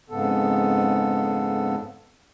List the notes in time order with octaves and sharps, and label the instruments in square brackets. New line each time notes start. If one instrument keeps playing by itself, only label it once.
[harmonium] F2 G#2 C#3 B3 A4